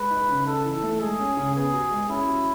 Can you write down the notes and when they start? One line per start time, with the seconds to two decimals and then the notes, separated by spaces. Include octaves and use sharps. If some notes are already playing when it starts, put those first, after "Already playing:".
Already playing: G#3 B4
0.10 D#4
0.29 C#3
0.46 D#4 A4
0.64 E3
0.83 A3
1.01 G#3 G#4
1.20 C#4
1.37 C#3
1.55 B3 G#4
1.73 F#4
1.91 G#3
2.09 C#4 E4
2.28 F#4